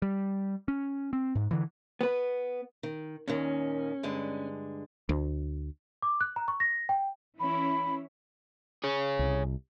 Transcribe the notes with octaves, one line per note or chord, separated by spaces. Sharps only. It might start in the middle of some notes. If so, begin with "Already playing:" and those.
G3
C#4
C4
G#2
D3 E3
B3 B4
D#3
D#2 A#2 D#3 C#4
G2 D3 G#3
D2
D6
F#6
A#5
C#6
A#6
G5
E3 C#4 E4 B5
G#4 C#5
C2